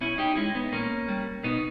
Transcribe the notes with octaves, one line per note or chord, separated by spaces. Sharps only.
B2 C#4 E4
D#4 G4
G#3 C#4 E4
B3 D#4
A#2 A#3 C#4
G3
B2 B3 D#4